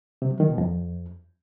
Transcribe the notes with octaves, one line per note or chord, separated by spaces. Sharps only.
C3
F#3
D#3
B2
F2